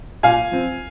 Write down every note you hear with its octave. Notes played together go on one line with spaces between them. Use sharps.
A#2 F5 G#5
F3 C4